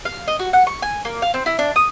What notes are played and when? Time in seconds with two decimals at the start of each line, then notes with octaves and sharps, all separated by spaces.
0.05 F5
0.28 D#5
0.39 F#4
0.53 F#5
0.67 C#6
0.82 G#5
1.05 A#3
1.22 F5
1.34 C4
1.46 E4
1.59 D4
1.76 D#6